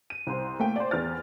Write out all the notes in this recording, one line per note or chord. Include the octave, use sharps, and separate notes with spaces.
D#7
C2 C5
A3 A#3 G5
C5 D5
E2 F6 A6